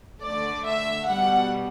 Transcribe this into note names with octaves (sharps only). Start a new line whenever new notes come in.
D3 A3 D5
E5
B2 G3 F#5